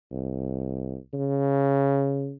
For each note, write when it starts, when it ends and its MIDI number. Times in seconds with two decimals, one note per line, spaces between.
0.11 0.96 36
1.13 2.33 49